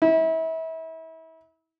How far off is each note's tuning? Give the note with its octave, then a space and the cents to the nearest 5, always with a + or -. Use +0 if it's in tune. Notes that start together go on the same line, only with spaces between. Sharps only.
E4 -30